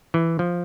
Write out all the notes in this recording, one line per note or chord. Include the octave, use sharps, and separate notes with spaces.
E3
F3